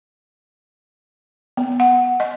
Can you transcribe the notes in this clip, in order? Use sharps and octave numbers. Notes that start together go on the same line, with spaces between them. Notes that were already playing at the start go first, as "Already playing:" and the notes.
B3
F#5
D#5